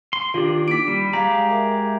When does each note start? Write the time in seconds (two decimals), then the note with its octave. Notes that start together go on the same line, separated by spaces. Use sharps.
0.13 C6
0.34 D#3 D4 F4 G4
0.68 A#3 E4 D6 B6 D7
0.88 G3 B5
1.13 G#3 G4 D5 F5 A#5 D6
1.50 A#4 E5